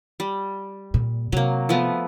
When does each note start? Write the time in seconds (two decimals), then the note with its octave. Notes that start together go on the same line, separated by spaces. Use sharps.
0.20 G3
0.94 A#2
1.32 C3 F#3 A#3
1.69 F3 A3 B3